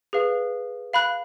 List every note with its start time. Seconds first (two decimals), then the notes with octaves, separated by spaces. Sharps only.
0.13 G#4 B4 F5
0.93 F5 B5 F#6